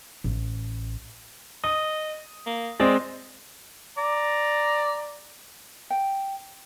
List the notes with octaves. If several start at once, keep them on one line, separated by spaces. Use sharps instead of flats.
A1
D#5 D#6
A#3
G#3 C4 D5 D#5
D5 A#5
G5